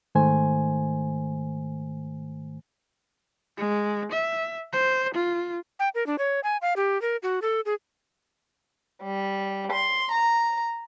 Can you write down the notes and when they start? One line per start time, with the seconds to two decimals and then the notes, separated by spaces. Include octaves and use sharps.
0.15 G#2 D#3 A3 C5 G#5
3.58 G#3
4.12 E5
4.73 C5
5.15 F4
5.79 G5
5.95 A#4
6.07 D4
6.19 C#5
6.44 G#5
6.62 F5
6.76 G4
7.02 A#4
7.23 F#4
7.42 A4
7.66 G#4
9.02 G3
9.73 C6
10.12 A#5